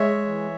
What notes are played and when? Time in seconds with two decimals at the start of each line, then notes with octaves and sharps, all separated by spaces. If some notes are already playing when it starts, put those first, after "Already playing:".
Already playing: G#3 C#5 E5
0.26 E3